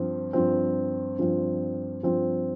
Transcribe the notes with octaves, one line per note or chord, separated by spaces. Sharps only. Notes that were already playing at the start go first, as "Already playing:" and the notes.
Already playing: G2 F3 C4
G2 F3 C4
G2 F3 C4
G2 F3 C4